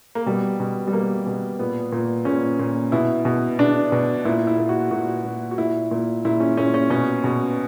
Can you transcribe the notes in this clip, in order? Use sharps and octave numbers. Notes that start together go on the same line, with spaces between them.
A#3
B2 G3
B2
G3
B2 A#3
B2
A#2 B3
A#2
A#2 C#4
A#2
B2 E4
B2
B2 D4
B2
A#2 E4
E4
A#2
F#4
A#2 F#4
A#2
F#4
A#2 E4
A#2
A#2 E4
C#4
A#2 C#4
C#4
B2 C#4
B2